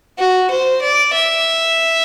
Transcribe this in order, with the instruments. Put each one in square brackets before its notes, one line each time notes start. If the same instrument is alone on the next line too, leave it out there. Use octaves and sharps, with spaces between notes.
[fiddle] F#4
C5
D5
E5